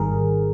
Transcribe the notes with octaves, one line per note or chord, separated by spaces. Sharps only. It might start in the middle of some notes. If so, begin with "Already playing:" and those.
Already playing: G#1 G#2 D#3 G3 G#4 A#4